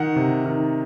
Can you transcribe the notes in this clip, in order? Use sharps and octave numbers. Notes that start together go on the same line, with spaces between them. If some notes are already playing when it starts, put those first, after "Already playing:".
Already playing: D#3 F#5
C3
D#3